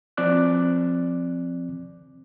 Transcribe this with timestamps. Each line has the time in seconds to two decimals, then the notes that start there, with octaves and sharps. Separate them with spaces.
0.17 F3 C4 D5 D6 F#6